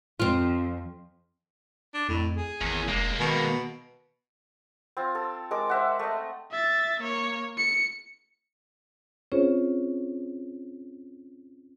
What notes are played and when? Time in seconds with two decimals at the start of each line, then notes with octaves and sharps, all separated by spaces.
0.20 F2 C4 F4
1.94 D4
2.09 F2 A2
2.37 G#4
2.61 G#1 E2
2.88 F1 G#3 A#3
3.20 B2 D#3
4.97 C4 F4
5.15 A4
5.51 G#3 A#4 D6
5.69 C5 E5 F#5
5.99 A3 D#5
6.51 E5 A6
7.01 A#3 C#5
7.58 C#7
9.32 C4 C#4 F4 G#4 C5 C#5